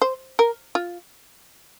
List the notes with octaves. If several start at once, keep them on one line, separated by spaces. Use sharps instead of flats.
C5
A#4
F4